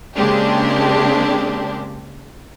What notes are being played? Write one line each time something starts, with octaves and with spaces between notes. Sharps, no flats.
C#3 G#3 A#3 C4 D4 G4